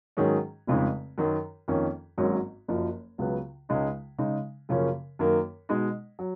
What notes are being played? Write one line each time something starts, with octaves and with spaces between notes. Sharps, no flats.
G#2 D#3 F#3 C#4 G#4
F1 F2 C#3 G#3 D#4
F#2 D#3 F#3
F2 D#3 A#3 C#4
G#1 G#2 F#3 A#3 C#4
F#1 F#2 F3
C#2 C#3 F#3 B3
C#2 C#3 G#3 D#4
C#3 G#3 D#4
F#2 C#3 F3 A#3 C#4
F#2 D#3 A#3
B2 G#3 D#4
F#3